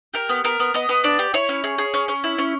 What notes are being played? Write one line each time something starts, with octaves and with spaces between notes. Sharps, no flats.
G4 A#4
B3
B3 A#4
B3
B3 D#5
B3
D4 D5
G4
E4 C#5
C#4
G#4
G#4
C#4
C#4
E4
C#4